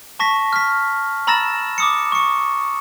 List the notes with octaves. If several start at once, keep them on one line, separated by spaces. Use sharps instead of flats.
A5 C#6 A#6 B6
F6 B6
A#5 B5 E6 A6 A#6 E7
D6 D#6 C#7
C#6 C#7